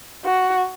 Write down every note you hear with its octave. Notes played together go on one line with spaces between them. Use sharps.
F#4